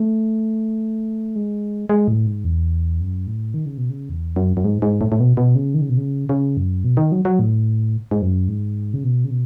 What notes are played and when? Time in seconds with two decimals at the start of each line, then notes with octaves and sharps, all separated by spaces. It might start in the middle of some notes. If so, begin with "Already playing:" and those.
Already playing: A3
1.36 G#3
1.89 G#3
2.08 A2
2.27 G#2
2.44 E2
3.00 F#2
3.27 A2
3.54 D#3
3.66 C#3
3.77 B2
3.90 C#3
4.10 E2
4.36 F#2
4.57 F#2
4.64 G#2
4.82 G#2
5.01 A2
5.12 A2
5.20 B2
5.37 B2
5.55 C#3
5.74 D#3
5.81 C#3
5.89 B2
5.97 C#3
6.29 C#3
6.57 F#2
6.84 B2
6.97 D#3
7.12 F#3
7.25 F#3
7.39 A2
8.11 G#2
8.22 F#2
8.48 G#2
8.94 C#3
9.04 B2
9.24 C#3
9.30 B2